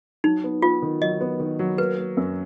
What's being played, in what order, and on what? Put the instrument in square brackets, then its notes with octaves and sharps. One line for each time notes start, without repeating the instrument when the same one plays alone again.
[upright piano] F#3 [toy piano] D#4
[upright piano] B3
[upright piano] B3 [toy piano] F4
[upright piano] D#3
[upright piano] F#3 [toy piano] D#5
[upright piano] B3
D#3
F#3
[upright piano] A#3 [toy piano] B4
[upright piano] A#3
F#2